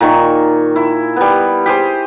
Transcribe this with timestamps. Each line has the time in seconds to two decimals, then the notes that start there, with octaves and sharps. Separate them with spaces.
0.01 A#2 D#3 C#6
0.76 E4
1.16 G3 B3
1.66 G4 G#4 C5